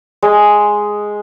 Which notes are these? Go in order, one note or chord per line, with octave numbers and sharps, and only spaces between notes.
G#3